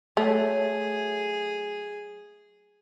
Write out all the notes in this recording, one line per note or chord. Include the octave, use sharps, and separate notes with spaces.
F#3 A3 G#4 C#5 D#5